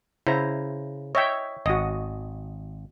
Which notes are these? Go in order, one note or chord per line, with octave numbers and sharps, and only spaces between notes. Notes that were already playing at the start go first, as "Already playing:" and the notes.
C#3 E4 C5 A#5
C#5 D#5 E5 G5
G#1 F#4 D#5